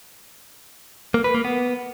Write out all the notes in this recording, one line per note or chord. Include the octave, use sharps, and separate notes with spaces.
A#3
B4
A#3
B3